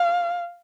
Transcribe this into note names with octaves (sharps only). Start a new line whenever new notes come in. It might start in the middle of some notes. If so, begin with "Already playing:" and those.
Already playing: F5